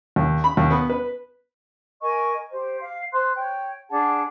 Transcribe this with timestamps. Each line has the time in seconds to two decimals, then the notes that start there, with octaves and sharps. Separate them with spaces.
0.16 D#2
0.44 B5
0.57 D#2
0.70 B3
0.90 B4
2.01 A#4 D#5 G#5 C#6
2.52 G4 C5
2.80 F5
3.12 C5 C6 F#6
3.37 C#5 G5
3.89 D4 G#4 F#5 A5